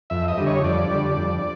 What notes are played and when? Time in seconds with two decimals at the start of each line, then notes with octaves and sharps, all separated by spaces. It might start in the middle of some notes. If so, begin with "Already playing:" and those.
0.10 F2 E5
0.28 D#5
0.38 D3 G3
0.46 C#5
0.64 F2 D5
0.92 D3 G3
1.17 F2